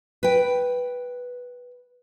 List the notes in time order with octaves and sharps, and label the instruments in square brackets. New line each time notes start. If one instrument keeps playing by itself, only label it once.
[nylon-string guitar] B4 G5